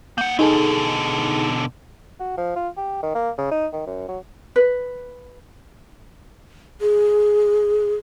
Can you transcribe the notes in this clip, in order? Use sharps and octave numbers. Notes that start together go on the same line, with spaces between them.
A#3 F#5 G6
B2 D3 D#4 G#4 A4
F#4
F3
F4
G4
D#3
A#3
C#3
D#4
D#3
F#2
F#3
B4
G#4